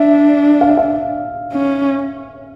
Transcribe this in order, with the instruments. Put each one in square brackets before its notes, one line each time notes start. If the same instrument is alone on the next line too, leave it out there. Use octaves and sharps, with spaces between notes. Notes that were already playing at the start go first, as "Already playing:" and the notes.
Already playing: [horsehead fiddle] D4 [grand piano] E5
[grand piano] F5
E5
F5
[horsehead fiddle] C#4